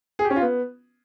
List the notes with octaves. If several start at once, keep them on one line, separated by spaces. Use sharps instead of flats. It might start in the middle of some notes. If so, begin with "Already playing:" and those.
G#4
G4
C#4
F4
B3